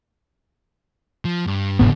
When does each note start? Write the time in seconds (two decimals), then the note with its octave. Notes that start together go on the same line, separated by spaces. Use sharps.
1.25 F3
1.46 G2
1.79 F1 D2 G#2 B3 D4